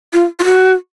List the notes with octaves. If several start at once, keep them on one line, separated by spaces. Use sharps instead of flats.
F4
F4
F#4